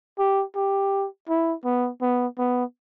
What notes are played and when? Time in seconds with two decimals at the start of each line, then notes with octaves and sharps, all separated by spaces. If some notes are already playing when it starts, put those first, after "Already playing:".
0.19 G4
0.56 G4
1.29 E4
1.65 B3
2.01 B3
2.38 B3